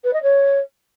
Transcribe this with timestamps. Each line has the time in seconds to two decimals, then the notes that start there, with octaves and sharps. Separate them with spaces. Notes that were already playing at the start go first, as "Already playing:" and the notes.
0.04 B4
0.13 D#5
0.23 C#5